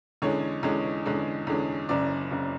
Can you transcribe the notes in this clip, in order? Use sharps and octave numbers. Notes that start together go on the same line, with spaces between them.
E2 D3 G#3 C#4 C#5
E2 D3 G#3 C#4
E2 D3 G#3 C#4
E2 D3 G#3 C#4
F#1 F#2 C#3 D5
F#1 F#2 C#3